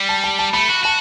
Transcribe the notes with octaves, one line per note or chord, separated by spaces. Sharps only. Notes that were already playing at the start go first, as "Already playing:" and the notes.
Already playing: G3
A5
A5
A5
A3 B5
F#4
F#4 A5